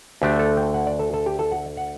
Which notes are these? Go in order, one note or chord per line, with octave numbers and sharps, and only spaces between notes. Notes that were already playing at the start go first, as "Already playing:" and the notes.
D2 D3 A3 D4 G4
A4
G5
F#5
D5
A4
A4
G4
A4
F#5
F#5